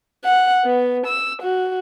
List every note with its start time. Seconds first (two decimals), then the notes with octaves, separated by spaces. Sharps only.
0.25 F#5
0.65 B3
1.07 E6
1.42 F#4